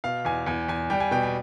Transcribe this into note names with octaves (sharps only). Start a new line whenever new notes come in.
B2 F5
E2 G#5
E2 G#5
E2 G#5
G3 G5
G#5
B2 G5
G5